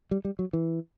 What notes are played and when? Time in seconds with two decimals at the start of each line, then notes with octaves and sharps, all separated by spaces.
0.11 G3
0.25 G3
0.39 F#3
0.53 E3